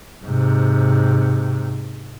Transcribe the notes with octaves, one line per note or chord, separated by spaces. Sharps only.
G#2 C3